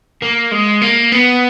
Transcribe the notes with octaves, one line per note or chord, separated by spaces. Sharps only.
A#3
G#3
A#3
B3